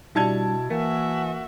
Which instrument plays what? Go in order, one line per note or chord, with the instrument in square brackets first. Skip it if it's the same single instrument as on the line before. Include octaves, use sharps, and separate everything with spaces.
[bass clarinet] B2 [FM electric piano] G3 D4 [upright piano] E4 A5 G#6
[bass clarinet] E3 [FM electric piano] A#3 [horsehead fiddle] F#4 E5